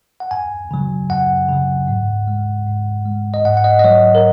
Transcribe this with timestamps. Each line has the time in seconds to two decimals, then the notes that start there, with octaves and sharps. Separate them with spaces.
0.20 F#5
0.31 F#2 G#5
0.71 C#3 F#3
1.10 F#2 F#5
1.48 C#3 F#3
1.88 G#2
2.27 G#3
2.67 G#2
3.05 G#3
3.34 D#5
3.45 G#2 F#5
3.57 F#5
3.64 D#5
3.79 D#5
3.84 F#3 C#5
4.15 A#4